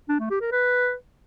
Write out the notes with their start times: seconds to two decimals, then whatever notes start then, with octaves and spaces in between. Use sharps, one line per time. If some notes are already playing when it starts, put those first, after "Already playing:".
0.09 D4
0.20 A3
0.30 G4
0.41 A#4
0.52 B4